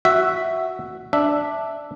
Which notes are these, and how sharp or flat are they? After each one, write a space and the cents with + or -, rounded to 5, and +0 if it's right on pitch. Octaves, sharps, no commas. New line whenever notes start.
F#4 +0 E5 +0
D4 +0 E5 +0